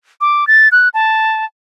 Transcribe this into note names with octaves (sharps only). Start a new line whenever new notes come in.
D6
A6
F#6
A5